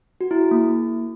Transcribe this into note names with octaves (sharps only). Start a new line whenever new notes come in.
F#4
E4
G#4
A#3